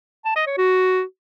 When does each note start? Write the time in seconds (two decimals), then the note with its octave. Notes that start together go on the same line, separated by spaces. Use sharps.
0.25 A5
0.36 D#5
0.47 C#5
0.57 F#4